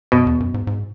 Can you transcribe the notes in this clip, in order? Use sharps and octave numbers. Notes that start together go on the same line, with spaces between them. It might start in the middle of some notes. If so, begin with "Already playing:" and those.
F#2 B2
E2
F#2
G#2
G#2